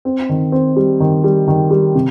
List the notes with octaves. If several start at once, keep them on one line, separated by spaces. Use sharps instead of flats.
C4
D#3
C4
G3
D#3
G3
D#3
G3
C3